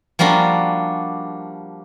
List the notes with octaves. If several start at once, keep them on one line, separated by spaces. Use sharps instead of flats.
F3 G3 A#3 D4 F#4